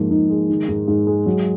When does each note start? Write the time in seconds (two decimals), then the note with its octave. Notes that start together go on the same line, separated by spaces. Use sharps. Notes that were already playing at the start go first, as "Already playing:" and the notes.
Already playing: G#2 F3 A#3
0.11 G#2 D#4
0.30 G#3
0.50 D#3
0.68 G#2
0.88 G#2
1.07 G#3
1.26 F#3